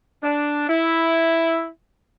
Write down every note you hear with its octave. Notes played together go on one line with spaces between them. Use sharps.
D4
E4